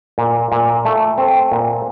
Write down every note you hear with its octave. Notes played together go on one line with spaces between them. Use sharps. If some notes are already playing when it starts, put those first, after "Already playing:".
A#2
A#2
A3
C4
A#2